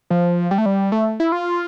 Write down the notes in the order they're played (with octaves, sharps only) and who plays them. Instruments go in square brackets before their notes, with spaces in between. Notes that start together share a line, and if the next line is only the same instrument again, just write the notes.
[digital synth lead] F3
G3
A3
G3
A3
E4
F4